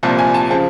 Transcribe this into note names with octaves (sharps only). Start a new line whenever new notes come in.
C2 A#2 F3 A5
G#5
A5
C#3 F3 A5